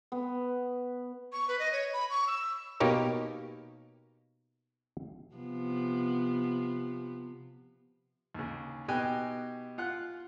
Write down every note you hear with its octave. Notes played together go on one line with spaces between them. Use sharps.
B3
C#6
B4
D#5
C#5
B5
C#6
E6
B2 A#3 D#4 G4 A#4 C#5
C3 F3 B3
D#2 C#3
B2 D#4 G4 G5 G#5 F#6
F4 F#5 F#6